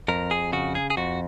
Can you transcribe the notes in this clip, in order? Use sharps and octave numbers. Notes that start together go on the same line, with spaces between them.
F2 A#4
G#4
C#3 F#4
G#4
G#4
F2 F#4